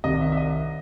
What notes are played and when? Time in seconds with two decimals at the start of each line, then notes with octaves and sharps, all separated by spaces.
0.04 C2 C3 D#3 D#5
0.20 E5
0.32 E5
0.37 D#5